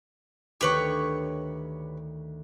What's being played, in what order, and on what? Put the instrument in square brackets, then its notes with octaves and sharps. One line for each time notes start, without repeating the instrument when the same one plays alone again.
[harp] D2 D#3 G5 [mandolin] G4 B4 C#5